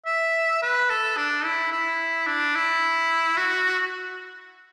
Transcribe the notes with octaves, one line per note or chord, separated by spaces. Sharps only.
E5
B4
A4
D4
E4
E4
D4
E4
F#4